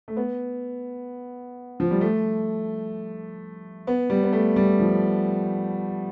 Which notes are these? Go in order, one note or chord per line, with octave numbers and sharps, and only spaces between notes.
A3
B3
F3
G3
A3
B3
G3
B3
A3
G3
F3